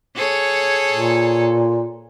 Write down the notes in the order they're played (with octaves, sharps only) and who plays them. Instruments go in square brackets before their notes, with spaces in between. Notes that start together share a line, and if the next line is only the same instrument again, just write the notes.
[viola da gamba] G#4 A4 C#5
[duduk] A#2